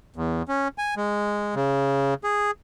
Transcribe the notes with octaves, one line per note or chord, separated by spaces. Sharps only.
E2
C#4
G#5
G#3
C#3
G#4